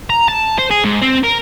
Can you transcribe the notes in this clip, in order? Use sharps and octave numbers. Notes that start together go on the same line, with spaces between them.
A#5
A5
C5
G#4
G#2
C4
A#4